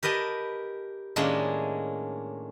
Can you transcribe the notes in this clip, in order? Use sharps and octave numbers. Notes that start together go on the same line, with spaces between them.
G4 A#4 B4 D#5 A5
A2 D#3 G#3 A#3 C#4 D4